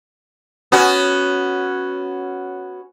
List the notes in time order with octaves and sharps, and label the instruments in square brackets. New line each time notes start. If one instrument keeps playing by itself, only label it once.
[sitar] B3 C#4 F#4